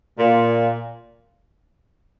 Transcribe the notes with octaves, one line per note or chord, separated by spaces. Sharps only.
A#2